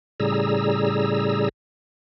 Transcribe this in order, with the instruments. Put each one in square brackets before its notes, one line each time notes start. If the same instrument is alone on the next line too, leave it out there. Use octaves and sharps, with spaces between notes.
[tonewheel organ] A2 C#3 G3 G#4 A#5 E6